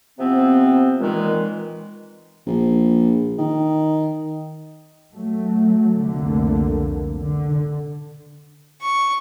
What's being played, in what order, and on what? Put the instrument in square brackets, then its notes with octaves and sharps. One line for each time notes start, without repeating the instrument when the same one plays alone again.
[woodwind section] C3 F3 B3 C4
A#2 D#3 E3 G#3
[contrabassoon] A#1
D#3
[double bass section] F#3 A3
C2 F2 D3 A3 A#3
D3
[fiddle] C#6